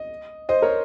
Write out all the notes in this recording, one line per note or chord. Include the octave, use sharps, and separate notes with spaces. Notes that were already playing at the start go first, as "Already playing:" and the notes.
Already playing: D#5
C5 D#5
A#4 C#5